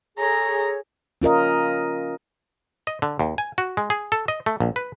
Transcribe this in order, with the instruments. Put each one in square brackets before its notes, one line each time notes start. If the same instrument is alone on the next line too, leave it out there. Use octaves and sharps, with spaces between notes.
[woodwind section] G#4 A4 C#5 [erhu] A#5
[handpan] C#4 F4 A#4 D#5
[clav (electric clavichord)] D#5
D3
D#2
G#5
F#4
G#3
G#4
A4
D#5
A3
A#1
B4